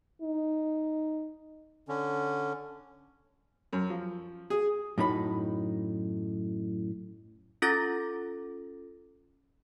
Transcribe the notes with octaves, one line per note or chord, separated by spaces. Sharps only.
D#4
D3 C#4
F#2
F3
G#4
F#2 A2 D#4 B5
C#4 F4 A4 D6 A6 A#6